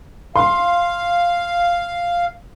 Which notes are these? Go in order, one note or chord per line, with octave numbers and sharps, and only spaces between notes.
F5 C6